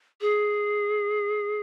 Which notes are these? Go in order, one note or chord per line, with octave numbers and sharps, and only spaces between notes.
G#4